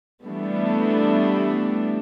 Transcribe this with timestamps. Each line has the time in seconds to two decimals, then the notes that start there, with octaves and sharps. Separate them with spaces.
0.24 E3 G3 A3 B3 D4